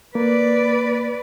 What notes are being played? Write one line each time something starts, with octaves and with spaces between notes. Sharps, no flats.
A#3 B4 D5